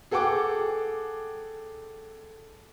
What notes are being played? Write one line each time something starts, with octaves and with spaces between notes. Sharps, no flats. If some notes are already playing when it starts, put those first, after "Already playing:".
G#4 A4 F#5 G5 D6